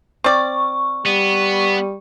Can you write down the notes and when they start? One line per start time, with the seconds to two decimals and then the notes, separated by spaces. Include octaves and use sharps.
0.24 C4 D5 C#6
1.06 G3 B3